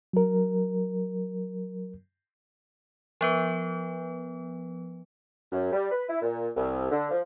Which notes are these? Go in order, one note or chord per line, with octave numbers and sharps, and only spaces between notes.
F#3 A#4
F3 B3 B4
F#2
G3
B4
E4
A#2
C2
D3
F3